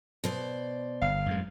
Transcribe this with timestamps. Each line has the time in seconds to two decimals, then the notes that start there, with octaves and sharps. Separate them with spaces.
0.24 B2 C5 D5
1.02 G1 F5
1.26 F#2 A2 G#3